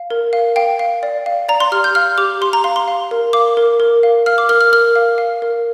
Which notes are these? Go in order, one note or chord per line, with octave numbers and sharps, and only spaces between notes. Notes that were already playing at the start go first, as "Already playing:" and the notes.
Already playing: F5
A#4
F5
F5 G5
F5
D5
F5
D5 A#5
C6
G4 F6
G6
F5 F6
G4 D6
G4 C6
A#5
F5 C6
C6
F5
A#4
F5 D6
A#4
A#4
F5
F5 F6
D6
A#4 F6
F6
A#4 F6
F5
F5
A#4